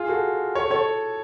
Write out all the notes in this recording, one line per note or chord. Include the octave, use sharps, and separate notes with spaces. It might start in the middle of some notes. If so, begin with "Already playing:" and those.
Already playing: F4 G#4
F#4 A4
A4 C#5
A4 C#5